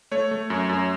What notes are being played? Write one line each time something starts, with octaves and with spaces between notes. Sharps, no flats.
A3 C#5
A3
F#2
F#2